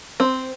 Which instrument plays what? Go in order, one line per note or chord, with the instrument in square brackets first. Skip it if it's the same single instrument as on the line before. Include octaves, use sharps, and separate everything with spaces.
[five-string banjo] C4